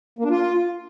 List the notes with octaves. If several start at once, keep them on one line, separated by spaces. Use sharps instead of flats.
A#3
D4
F4